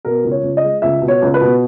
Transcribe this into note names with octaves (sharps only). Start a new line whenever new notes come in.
B2 A#4
C#2
C#5
C#2
D#5
G#3
C#2 E5
B2
C#5
C#2
B4
B2